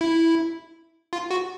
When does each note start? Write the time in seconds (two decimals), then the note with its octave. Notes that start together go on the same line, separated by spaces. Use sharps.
0.01 E4
1.13 F4
1.31 F#4